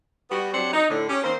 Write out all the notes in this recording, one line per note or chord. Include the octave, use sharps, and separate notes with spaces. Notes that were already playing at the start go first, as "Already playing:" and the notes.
G3 B3 F#4
F#3 C4 D4 G4 C5 F#5
D#4
A2 D3
C#4 G4
D#3 A#3 C4 C5